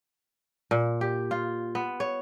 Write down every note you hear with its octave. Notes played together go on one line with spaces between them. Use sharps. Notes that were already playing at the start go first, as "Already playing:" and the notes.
A#2
G4
F4
B3
C#5